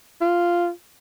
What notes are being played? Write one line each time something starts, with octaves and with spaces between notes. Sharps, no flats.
F4